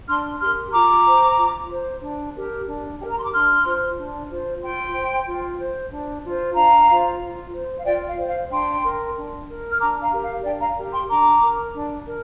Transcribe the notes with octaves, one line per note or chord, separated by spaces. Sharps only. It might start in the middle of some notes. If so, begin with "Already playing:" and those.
D4 C6 F6
G4 A#4 C6 F6
F4 A#5 D6
C5
F4
C5
D4
G4 A#4
D4
G4 A#4 G5
A#5
C6
D6
D4 C6 F6
F4 C5
D4
F4 C5
F4 G5 C6
C5
F4
C5
D4
F4 C5
D4 F5 A#5
F4 C5
F4
C5
F5
F4 D5 G5
F5
C5
F5
D4 G5 C6
A#4
D4
A#4
F6
D4 A#5 D6
F5 A#5
G4 A#4
F5
D4 D5 G5
F5 A#5
G4 A#4
G5 C6
D4 A#5 D6
A#4
D4
A#4